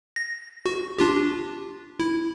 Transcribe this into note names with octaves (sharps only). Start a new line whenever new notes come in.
A#6
F#4
D4 F4 G4
E4